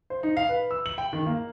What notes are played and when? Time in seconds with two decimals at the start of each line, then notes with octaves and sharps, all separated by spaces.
0.10 C5
0.23 D#4
0.37 F5
0.49 B4
0.71 E6
0.86 F#7
0.98 G5
1.13 D#3
1.26 A#3